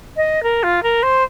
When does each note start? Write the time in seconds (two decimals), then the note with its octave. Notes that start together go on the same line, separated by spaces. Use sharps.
0.16 D#5
0.43 A#4
0.63 F4
0.83 A#4
1.03 C5